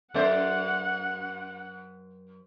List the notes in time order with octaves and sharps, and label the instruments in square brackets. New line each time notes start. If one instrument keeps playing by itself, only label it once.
[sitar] F#2 C5 [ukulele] A4 D5 E5 [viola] F#5